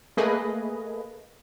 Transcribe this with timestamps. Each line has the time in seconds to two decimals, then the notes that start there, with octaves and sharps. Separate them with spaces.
0.17 A3 A#3 G#4 B4 D#5